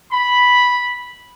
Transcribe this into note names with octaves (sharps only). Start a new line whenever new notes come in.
B5